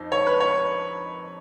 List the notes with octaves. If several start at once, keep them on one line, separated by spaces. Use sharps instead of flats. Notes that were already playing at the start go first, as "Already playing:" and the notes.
Already playing: F2 F3 D#4
C#5
B4
C#5